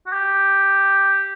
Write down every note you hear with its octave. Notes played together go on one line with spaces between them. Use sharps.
F#4
G4